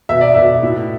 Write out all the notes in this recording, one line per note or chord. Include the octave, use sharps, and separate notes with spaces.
B2 E5
D5
B2 E5
A2